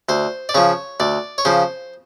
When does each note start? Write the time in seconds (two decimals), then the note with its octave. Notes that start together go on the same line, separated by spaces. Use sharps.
0.09 D2 C5
0.49 D5
0.54 C#3 F3 C#5
1.00 D2 D5
1.38 C#5
1.45 C#3 F3 C5